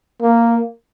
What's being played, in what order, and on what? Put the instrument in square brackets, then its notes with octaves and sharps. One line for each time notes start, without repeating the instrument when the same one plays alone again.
[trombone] A#3